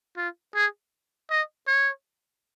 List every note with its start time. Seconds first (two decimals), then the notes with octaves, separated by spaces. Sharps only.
0.17 F4
0.55 G#4
1.30 D#5
1.67 C#5